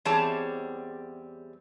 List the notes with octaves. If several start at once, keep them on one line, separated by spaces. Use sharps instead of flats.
E2 G3 C4 G#4 C#5 A5